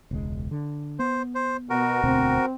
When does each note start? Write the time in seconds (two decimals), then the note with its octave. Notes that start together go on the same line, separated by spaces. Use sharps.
0.11 E1 C#2 G#3
0.51 D3
0.99 B3 C5
1.35 C5
1.70 B2 F#4 A#4
2.04 E1 D2 B2 C4